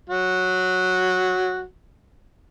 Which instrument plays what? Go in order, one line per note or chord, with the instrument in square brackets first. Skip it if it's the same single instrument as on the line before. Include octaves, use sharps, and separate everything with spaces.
[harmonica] F#3 F#4